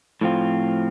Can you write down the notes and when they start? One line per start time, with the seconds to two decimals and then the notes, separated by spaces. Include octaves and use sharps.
0.21 A2 F3 C4 F4